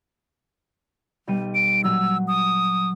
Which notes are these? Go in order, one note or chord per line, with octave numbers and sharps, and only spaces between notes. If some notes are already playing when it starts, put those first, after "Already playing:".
B1 G3 D#7
D7
A#2 F#3 E6
D#6